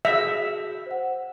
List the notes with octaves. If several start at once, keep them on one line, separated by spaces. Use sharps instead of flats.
F#4 G#4 E5 G6
C5 F#5